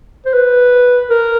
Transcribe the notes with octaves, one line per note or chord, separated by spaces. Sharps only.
C5
B4
A#4